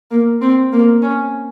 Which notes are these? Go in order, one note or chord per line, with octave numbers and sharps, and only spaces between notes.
A#3
C4
A#3
C#4